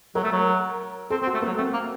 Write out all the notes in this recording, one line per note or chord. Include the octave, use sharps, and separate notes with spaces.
F#3 A#4
A3
F#3
C4 A4
C4
F#4
A3
A#3
F#3
A3 C4
A#3